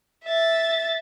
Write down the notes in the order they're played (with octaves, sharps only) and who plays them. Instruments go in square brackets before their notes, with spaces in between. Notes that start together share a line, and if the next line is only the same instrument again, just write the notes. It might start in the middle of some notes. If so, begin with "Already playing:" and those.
[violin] E5 A6